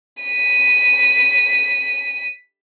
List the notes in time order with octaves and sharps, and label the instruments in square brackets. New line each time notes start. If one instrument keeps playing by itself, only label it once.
[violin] B6 D#7